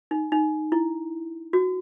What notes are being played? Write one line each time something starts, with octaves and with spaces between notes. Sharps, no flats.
D#4
D#4
E4
F#4